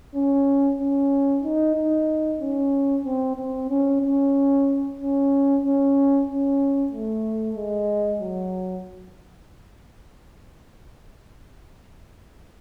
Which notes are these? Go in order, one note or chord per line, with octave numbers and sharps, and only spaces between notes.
C#4
C#4
D#4
D#4
C#4
C4
C4
C#4
C#4
C#4
C#4
C#4
A3
G#3
F#3